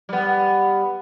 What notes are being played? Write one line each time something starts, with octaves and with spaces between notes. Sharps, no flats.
G3 B3